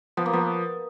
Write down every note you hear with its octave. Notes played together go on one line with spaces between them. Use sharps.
F3 B3
A#3
F3 B3